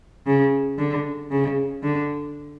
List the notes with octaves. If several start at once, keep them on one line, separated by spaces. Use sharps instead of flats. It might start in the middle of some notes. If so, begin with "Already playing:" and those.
C#3
D3
C#3
D3